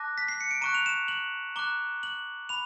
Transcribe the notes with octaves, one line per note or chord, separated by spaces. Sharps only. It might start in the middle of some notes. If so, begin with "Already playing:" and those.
Already playing: A5 D6 F#6 A#6
B6
C7
C#7
D7
A#5 C#6 F#6 D#7
F7
E7
F#7
A#5 D6 F#6 G7
F#7
B5 F7